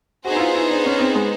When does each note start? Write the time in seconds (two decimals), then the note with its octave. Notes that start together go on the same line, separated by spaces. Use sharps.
0.25 B3 D#4 F#4 G#4 C5
0.36 E4
0.39 F4
0.55 E4
0.71 D4
0.86 C#4
1.00 C4
1.15 G#3